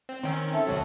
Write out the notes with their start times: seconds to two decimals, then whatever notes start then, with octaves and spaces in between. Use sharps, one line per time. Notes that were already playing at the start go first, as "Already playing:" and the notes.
0.09 C4
0.24 D#3 C4 C#4 G5 E6
0.54 A4 E5
0.67 D2 B2 F#3 C#5